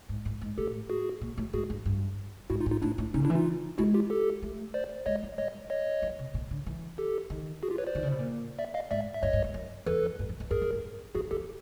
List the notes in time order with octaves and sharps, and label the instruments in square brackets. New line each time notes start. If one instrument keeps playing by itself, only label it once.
[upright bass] G#2
G#2
G#2
[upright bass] A2 [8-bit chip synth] G4 A4
[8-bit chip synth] F#4 G#4
[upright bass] A#2
A2
[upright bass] G#2 [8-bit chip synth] F#4 G#4
[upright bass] G2
G2
[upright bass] G#2 [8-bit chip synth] E4 F#4
[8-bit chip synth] D#4 F4
[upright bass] A2
[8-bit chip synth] D#4 F4
[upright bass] A2 [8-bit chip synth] D4 E4
[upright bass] A2
[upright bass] C#3 [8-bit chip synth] C#4 D#4
[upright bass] D3
[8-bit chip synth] D4 E4
[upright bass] E3
[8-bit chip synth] D#4 F4
[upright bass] G#3 [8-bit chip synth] E4 F#4
[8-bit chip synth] F4 G4
G4 A4
[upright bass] A3
[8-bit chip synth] C5 D5
[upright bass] G#3 [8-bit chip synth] C#5 D#5
[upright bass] G3
[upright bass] G3 [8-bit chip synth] C#5 D#5
[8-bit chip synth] C#5 D#5
[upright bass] F#3
C3
A#2
D3
E3
[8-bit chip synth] G4 A4
[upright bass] D#3
[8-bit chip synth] F#4 G#4
F4 G4
B4 C#5
C5 D5
[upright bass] D#3
C#3
B2
A#2
[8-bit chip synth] D5 E5
D#5 F5
[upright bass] G#2 [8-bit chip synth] D5 E5
[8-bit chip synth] E5
[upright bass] G2 [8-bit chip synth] C#5 D#5
[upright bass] G2
G2
F#2
[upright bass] E2 [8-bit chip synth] A4 B4
[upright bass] F2
G2
F2
F2
[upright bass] F#2 [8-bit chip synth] G#4 A#4
[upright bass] F#2
G2
[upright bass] F2 [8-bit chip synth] F#4 G#4
[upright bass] E2 [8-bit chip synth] G4 A4